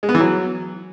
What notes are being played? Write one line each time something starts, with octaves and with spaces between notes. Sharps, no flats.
G#3
B3
E3
F#3